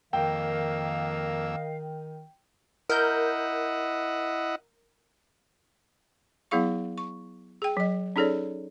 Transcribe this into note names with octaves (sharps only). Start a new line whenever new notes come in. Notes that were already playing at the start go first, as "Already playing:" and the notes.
F2 D#3 A#3 A#4 D#5 F5 G5 E6
E4 A#4 D#5 F#5 G6
F#3 B3 E4 G#4 F5 C#6
C#6
G#4 G5
F#3 D#5
C#4 D#4 G#4 A4 C#5 D5